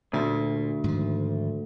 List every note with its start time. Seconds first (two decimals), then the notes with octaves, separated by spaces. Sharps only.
0.13 D2 A#2
0.84 G#2 D#3 F3